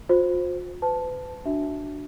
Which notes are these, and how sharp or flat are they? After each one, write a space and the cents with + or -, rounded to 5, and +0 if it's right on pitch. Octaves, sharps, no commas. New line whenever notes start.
F4 +45 C5 +0
B4 +35 A5 -5
D4 +0 F#4 +0 E5 -10